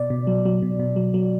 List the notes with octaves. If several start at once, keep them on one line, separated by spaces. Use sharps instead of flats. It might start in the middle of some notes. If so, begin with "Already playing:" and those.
Already playing: B2 D5
B2
F#3
F#3
B2
B2
F#3
F#3